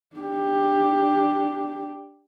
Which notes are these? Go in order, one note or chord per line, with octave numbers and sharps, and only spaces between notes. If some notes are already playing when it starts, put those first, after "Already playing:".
D4 G4